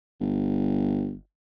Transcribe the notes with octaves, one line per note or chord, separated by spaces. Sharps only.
G1